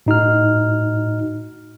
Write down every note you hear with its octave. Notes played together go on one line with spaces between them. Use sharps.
A2 D#4 F#4 F6